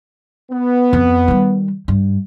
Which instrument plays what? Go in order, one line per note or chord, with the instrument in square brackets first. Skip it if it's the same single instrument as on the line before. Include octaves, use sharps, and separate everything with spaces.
[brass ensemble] B3
[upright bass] F2
D#3 G3
G2